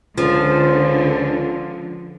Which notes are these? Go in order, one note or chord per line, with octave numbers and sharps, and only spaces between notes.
C#2 D3 F3